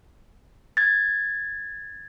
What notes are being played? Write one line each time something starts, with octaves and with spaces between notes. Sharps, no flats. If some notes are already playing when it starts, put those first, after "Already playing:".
G#6 A6